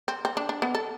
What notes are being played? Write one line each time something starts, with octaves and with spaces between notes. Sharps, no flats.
C4
C4
D4
D4
B3
A4